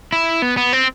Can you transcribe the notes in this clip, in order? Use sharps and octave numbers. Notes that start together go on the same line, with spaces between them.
E4
B3
B3
C4